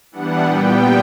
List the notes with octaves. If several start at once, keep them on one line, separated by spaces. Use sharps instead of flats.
E3 G3 B3 D4 F#5
A#2 G3 B3 G5